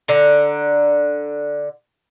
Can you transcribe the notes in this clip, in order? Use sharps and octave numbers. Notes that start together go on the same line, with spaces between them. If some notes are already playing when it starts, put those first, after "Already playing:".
D3 A#5